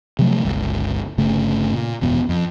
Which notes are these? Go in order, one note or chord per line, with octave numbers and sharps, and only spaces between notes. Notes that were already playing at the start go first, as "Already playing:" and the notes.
C3 F3 F#3 A3
G1 C#2 G2
G1 C#3 A3
A#2
F#1 E2 B2
F2